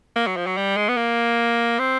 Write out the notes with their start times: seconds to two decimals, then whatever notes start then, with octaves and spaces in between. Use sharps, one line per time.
0.16 A#3
0.27 F#3
0.36 F3
0.46 F#3
0.57 G3
0.77 G#3
0.89 B3
0.97 A#3
1.79 C4